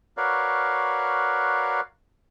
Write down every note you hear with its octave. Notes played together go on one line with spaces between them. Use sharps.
F#4 A#4 B4 C#5 D5 F5